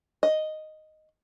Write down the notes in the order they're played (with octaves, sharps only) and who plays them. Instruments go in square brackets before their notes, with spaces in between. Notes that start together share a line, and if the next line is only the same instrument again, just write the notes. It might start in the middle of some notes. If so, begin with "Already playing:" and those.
[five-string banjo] D#5